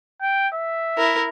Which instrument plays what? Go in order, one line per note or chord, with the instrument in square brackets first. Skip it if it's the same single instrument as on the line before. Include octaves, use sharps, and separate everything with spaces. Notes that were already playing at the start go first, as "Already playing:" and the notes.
[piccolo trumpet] G5
E5
[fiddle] E4 A#4